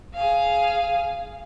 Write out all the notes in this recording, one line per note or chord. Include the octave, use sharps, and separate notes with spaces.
G#4 F5